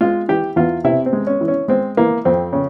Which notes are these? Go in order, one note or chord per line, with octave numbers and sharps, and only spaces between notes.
G#3 F4
E3 G4
E2 F4
C3 E4
C4
G#3
C#4
E3
C#4
G#3 C4
E3 A#3
F2 C4
C#3